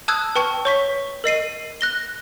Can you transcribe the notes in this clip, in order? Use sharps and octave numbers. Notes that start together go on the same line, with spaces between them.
A5 D#6 E6 F#6 G#6
B4 G5 A5 C#6
C#5 C#6 B6
A#4 D#5 C7 D#7
F#6 A#6 G7